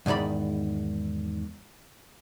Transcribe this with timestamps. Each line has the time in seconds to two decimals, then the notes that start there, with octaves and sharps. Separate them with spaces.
0.06 E2 G#2 D#3 D5 B5